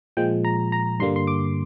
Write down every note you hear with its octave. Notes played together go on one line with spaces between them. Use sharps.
A#2 F3 G#3 G5
A#5
A#5
G2 D3 G3 A#3 C6
C6
D6